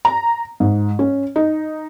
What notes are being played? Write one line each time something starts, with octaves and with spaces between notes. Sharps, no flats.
A#5
G#2
C#4
D#4